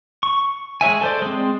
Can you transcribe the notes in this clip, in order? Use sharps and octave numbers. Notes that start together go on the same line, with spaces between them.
C#6
G#3 C#5 E5 G#5
A4 C5 D5
G#3 C4